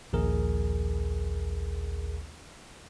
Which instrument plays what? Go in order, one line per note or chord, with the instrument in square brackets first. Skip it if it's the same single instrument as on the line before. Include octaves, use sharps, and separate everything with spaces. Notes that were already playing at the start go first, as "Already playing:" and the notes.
[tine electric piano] A#1 D#2 G#4 A#4